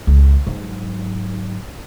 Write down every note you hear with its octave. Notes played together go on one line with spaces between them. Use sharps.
C#2
G#2 F#3